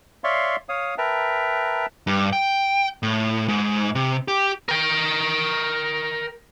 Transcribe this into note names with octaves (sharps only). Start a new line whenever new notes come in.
C#5 D5 E5 F5 C6 C#6
C#5 F5 D#6
A#4 B4 E5 G5 A5 A#5
G2
G5
A2
G#2
C3
G4
A#4 G5